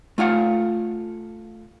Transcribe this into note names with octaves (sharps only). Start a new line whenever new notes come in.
A3 F4 F5 F#5